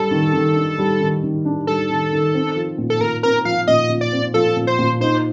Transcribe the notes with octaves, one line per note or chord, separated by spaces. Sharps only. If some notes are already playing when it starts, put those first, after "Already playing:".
Already playing: G3 D4 A4
D#3
D#3
D4
G3
D#3
D#3
D4
G3 A4
D#3
D#3
C4
F3
A#2
A4
A#2 A#4
C4 A#4
F3 F5
A#2 D#5
A#2
D5
C4
F3 A4
A#2
C5
A#2
D#4 C5